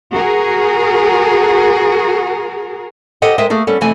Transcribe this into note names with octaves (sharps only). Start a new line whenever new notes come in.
F#4 G#4 A#4
G4 A4 C5 D#5 F#5 G5
G#3 A#4 C5 D#5 E5 G5
A3 A#3 G#4 A4
G3 B3 C#4 A4
F2 C3 E3 A3 G#5